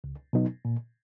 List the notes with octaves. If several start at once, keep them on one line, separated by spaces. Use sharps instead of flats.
C#2
B2 F#3 B3 D#4
A#2